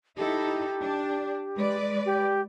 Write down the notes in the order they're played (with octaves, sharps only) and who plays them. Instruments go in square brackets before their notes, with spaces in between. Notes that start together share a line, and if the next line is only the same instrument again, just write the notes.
[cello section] D#4 E4 A4 [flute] G4
[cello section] D4
G#3 B4 D5
[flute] G4